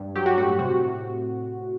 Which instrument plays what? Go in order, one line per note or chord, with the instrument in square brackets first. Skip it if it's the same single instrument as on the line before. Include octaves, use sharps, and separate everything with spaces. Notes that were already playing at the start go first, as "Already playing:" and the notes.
Already playing: [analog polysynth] G2
F#3 G4
F#4
A2 F#4
C3 F#4
C3